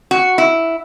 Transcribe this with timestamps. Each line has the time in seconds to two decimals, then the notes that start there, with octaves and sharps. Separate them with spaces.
0.11 F#4
0.38 E4